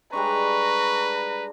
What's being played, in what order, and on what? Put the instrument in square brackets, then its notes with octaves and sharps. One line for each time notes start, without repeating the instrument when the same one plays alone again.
[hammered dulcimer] G3 G#3 D4 [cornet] B4 [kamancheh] A#5 [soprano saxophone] C#6